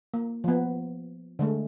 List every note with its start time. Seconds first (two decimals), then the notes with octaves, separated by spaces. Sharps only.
0.14 A#3
0.44 F3 B3
1.39 D3 G#3 A3